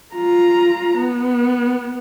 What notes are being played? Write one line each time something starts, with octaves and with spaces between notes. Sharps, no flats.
F4 A#5
B3